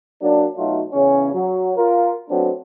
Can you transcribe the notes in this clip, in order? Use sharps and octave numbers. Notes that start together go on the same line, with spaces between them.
F#3 A#3 D4
B2 F#3 A3 D#4 F4
E2 C#3 C#4
F#3
F4 A#4
F#3 A3 B3 C4 D4